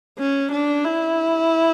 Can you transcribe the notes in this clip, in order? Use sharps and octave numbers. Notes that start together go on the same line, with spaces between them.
C#4
D4
E4